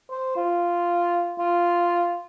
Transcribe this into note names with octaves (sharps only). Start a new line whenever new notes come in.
C5
F4
F4